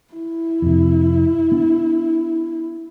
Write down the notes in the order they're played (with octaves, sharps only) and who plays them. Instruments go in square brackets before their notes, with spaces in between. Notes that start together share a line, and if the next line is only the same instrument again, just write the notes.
[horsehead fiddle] E4
[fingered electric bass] F2 C3
B3 D4